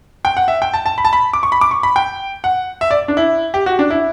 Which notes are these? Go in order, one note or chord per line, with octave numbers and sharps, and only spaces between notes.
G5
F#5
E5
G5
A5
A5
B5
A5
B5
D6
C#6
B5
D6
C#6
B5
G5
F#5
E5
D5
D4
E4
G4
F#4
D4
E4